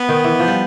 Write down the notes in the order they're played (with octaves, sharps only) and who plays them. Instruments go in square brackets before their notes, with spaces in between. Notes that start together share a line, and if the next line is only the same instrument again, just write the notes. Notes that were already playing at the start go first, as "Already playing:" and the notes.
Already playing: [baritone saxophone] B3
[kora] D#3
E3
F3
G3